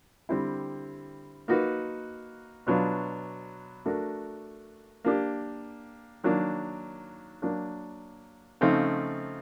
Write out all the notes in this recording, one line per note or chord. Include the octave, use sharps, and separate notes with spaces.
D3 G3 C4 E4
A#3 D#4 F#4 B4
B2 F#3 B3 D4 F4
A3 D4 F#4 A#4
A#3 D4 G4
D#3 F#3 A#3 D4
F#3 A#3 D4
C#3 F3 A3 C4 D#4